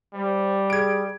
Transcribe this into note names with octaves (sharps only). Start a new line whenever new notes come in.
G3 C5
G#4 G#6 D7